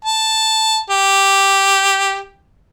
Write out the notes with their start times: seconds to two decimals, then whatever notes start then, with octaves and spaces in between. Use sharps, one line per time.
0.05 A5
0.90 G4